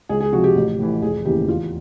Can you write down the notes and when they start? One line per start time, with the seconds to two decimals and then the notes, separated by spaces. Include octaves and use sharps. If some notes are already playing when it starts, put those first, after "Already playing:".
0.09 C#2 G#4
0.20 G#4
0.32 C3 F3 F#4
0.44 G4
0.56 A1
0.79 A2 E3
1.02 F1 G#4
1.25 D#2 C#3 E3 G4
1.48 E2 F4